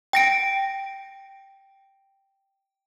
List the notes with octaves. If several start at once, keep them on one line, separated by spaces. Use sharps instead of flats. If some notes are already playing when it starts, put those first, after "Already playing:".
G5 A#6 D7